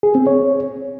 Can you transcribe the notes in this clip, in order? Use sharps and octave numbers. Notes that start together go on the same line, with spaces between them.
G#4
C4
C#5